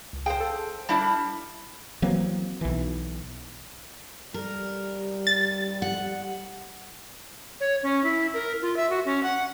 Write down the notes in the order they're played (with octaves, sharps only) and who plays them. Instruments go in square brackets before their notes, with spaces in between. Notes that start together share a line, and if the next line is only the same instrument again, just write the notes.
[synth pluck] C#2
[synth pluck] G#4 F5 [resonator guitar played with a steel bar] C5 G5
[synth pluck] A4
[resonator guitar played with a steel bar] G3 D4 E4 [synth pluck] A5
[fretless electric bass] E3 F#3 A#3 C4
B1 E3
[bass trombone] G3 [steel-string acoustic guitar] A#4
[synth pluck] A6
[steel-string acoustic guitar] F#5
[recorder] C#5
C#4
E4
A#4
F4
E5
F#4
C#4
F#5